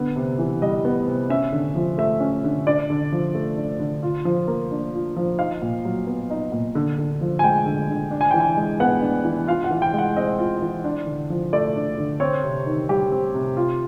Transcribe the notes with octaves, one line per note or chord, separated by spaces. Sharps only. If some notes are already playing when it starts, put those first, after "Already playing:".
Already playing: D3 B3
C3
E3
G3 D#5
B3
C3
C#4 E5
D3
F3
A3 E5
C#4
D3
D4 D5
D3
F3
A3
D4
D3
F4
F3
A#3
D4
F4
F3
D#4 F5
A#2
F#3
B3
D#4
A#2
D3
D3
F3
G#5
G#3 G5
D3
D3
D4
G#5
E3 G5
G#5
G#3
B3 F#5
D4
E3
F4 F5
F#5
E3
G5
G#3 F#5
C4 D#5
F4
E3
D4
D3
F3
A3 D5
D4
D3
C4 C#5
C3
D#3
G3 G4
C4
C3
F4